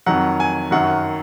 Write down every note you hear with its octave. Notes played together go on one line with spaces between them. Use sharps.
F2 D#3 F#3 F#5
G#5
F#2 D#3 F#3 F#5